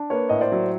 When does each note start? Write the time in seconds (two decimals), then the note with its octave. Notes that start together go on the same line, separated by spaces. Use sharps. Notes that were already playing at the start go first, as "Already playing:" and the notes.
Already playing: D4
0.10 A#3 B4 C#5
0.29 A2 D#5
0.41 C5 D5
0.52 F#3